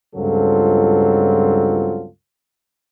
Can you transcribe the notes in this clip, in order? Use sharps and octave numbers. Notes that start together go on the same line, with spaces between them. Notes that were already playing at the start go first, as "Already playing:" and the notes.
C#2 G2 F#3 C4 F4 A4